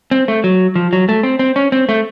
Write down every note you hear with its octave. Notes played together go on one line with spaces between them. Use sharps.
C4
A3
F#3
F3
F#3
A3
C4
C4
C#4
C4
A3